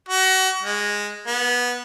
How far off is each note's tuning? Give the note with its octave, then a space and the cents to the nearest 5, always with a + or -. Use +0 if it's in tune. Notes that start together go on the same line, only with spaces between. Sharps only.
F#4 +30
G#3 -10
B3 -15